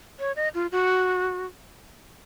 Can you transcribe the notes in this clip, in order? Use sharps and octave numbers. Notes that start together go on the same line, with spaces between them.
C#5
D#5
F4
F#4